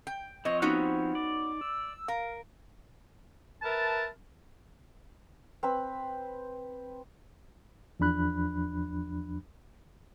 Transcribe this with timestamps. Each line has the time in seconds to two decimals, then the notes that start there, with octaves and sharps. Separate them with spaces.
0.07 G5
0.45 F3 C4 C#5 D#5
0.62 B3 C#4 D#4 F#4
1.15 D5
1.61 E6
2.08 A#4 F5
3.62 A#4 B4 E5 A5
5.63 C4 B4 B5
7.99 E2 F3 D4 B5 F#6